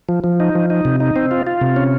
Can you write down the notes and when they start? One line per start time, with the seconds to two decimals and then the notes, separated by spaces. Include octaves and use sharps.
0.09 F3
0.24 F3
0.40 D#4
0.55 F3
0.70 D#4
0.85 C3
1.00 D#4
1.16 C4
1.31 F4
1.47 F4
1.61 C3
1.76 C#4